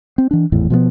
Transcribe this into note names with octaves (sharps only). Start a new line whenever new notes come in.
C4
E3 D4
G#1 E2 A2 E3
B2 F3 F#3 B3